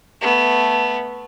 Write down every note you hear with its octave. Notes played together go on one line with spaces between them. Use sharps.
A3 B3